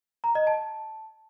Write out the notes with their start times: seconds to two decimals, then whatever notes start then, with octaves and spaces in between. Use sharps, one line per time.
0.24 A#5
0.35 D#5
0.47 A5